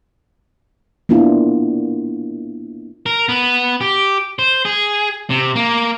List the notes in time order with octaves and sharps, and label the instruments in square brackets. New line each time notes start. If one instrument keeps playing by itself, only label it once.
[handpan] A#3 B3 D4 E4 F4
[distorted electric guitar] A#4
B3
G4
C5
G#4
C3
A#3